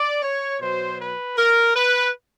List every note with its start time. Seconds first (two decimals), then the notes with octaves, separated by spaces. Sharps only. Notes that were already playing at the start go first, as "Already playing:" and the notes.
Already playing: D5
0.22 C#5
0.60 B2 F#3 C5
0.99 B4
1.37 A#4
1.75 B4